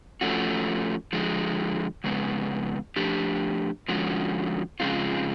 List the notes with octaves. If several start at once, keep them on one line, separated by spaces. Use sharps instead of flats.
F3 A3 C#4 F#4
D3 F3 G#3
F2 C#3 G#3 B3
F3 A3 D4 G4
D3 F3 G#3 C#4 F#4
C#3 F3 G#3 C4 F4